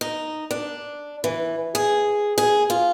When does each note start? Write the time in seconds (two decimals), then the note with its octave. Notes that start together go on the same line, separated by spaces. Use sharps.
0.01 D#4
0.51 D4
1.24 E3
1.75 G#4
2.38 G#4
2.70 F4